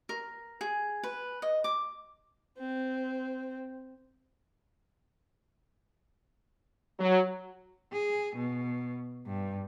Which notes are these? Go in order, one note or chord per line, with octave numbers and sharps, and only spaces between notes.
A#4
G#4
B4
D#5
D6
C4
F#3
G#4
B2
G2